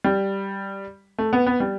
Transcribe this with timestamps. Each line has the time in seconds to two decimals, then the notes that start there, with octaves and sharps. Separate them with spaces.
0.04 G3
1.18 A3
1.33 B3
1.47 B3
1.60 G3